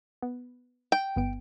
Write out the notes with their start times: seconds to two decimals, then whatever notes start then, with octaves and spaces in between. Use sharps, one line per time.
0.22 B3
0.92 G5
1.16 G1 B3 D7